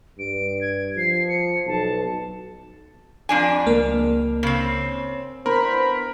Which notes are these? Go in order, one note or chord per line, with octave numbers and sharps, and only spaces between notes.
G2 D7
G#6
F3 C7
C#7
B1 A5
F2 D4 G#5
C#2 A#3 A#4
C#3 C4
B3 D4 E4 A#4 C5 B5